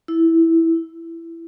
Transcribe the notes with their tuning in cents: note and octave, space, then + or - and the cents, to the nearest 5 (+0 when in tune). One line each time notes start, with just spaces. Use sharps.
E4 -5
E4 +15